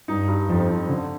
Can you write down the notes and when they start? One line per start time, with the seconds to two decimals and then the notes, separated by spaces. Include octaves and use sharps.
0.08 G2 D#4
0.28 G2
0.49 F2 F3
0.69 F3
0.89 D3